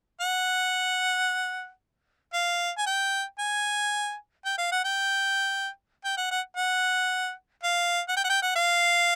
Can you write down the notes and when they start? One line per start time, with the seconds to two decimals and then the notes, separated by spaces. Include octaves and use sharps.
0.21 F#5
2.33 F5
2.78 G#5
2.86 G5
3.39 G#5
4.45 G5
4.58 F5
4.72 F#5
4.85 G5
6.05 G5
6.18 F#5
6.31 F#5
6.57 F#5
7.63 F5
8.08 F#5
8.17 G5
8.24 F#5
8.29 G5
8.42 F#5
8.56 F5